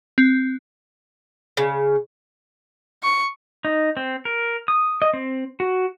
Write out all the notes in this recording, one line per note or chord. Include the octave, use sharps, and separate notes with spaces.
C4
C#3
C#6
D#4
C4
A#4
D#6
D#5
C4
F#4